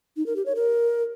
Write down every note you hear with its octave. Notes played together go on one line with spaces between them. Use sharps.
D#4
A#4
G4
C#5
A#4